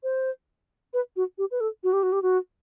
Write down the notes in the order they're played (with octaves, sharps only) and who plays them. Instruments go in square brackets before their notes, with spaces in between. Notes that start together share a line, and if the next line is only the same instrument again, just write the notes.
[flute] C5
B4
F#4
G4
B4
A4
F#4
G4
F#4
G4
F#4